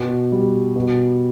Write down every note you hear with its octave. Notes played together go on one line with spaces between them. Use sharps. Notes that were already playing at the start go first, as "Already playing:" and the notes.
Already playing: B2
G3
B2